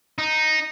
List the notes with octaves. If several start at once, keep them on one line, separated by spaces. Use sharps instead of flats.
D#4